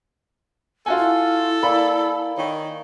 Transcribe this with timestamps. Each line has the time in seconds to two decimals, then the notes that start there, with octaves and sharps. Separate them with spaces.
0.86 F4 F#4 A4 G#5
0.98 E4
1.63 A#3 D5 G#5 B5
2.38 D#3 A#4 C#5